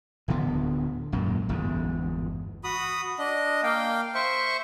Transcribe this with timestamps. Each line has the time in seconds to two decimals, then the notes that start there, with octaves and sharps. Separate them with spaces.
0.28 D1 D2 D3 B3
1.12 G#1 F#2 A#2
1.49 G1 E2 G#2
2.64 F#4 B5 D#6
3.19 D4 D#5
3.63 A#3 F5 G5
4.15 C5 E5 C#6